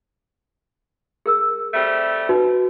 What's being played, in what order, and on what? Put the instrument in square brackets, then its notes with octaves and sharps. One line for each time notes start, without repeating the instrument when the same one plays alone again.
[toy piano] G#4 A#4 E6
[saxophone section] G3 A3 C4
[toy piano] D#4 [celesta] F#4 B4